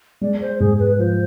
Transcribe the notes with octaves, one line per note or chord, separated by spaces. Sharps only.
G#3 D5
C5
G#2 G#4
B4
F3 C5